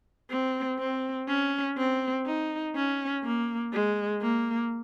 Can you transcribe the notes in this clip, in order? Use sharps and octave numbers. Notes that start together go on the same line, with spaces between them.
C4
C4
C#4
C4
D#4
C#4
A#3
G#3
A#3